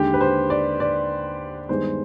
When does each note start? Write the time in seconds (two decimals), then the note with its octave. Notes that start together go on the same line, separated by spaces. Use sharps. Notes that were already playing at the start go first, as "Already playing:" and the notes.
Already playing: D#2 D3 G#3 G4
0.14 B4
0.21 C5
0.50 D5
0.80 D5
1.69 G2 D#3 G#3 B3 C5